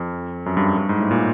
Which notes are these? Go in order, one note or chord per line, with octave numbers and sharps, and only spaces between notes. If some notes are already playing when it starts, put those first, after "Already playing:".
Already playing: F2
F#2
G2
G2
G#2
A2
A#2